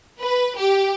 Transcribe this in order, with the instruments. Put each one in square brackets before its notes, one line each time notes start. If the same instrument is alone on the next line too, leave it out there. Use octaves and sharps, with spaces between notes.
[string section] B4
G4